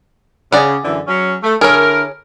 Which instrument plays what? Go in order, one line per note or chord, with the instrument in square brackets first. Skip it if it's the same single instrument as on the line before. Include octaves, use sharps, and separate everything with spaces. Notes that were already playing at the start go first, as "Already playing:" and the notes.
[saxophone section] C#3 [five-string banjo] G#4 D5 F#5
[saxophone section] F#2 D3 E3
F#3 C#4
A3
[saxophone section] D3 E4 A#4 [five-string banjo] G#4 C#5